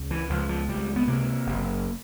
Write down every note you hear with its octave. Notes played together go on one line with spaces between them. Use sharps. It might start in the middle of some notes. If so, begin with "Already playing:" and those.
Already playing: C#2
E3
C#2 F3
F3
C#2 G3
B3
C3 A#3
F#1